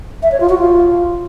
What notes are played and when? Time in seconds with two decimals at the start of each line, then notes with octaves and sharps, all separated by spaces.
0.23 E5
0.32 C#5
0.40 F4
0.49 F#4
0.58 F4